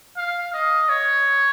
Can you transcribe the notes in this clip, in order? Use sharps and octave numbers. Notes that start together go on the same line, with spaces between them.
F5
D#5
C#5